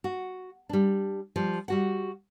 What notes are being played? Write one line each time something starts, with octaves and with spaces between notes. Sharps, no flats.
F#4
G3 D4
F3 G3
G3 F#4 F#5